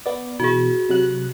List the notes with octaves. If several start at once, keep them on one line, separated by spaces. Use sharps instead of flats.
B3 D5
B2 E3 B3 F#4 G#4
C3 F#3 F#6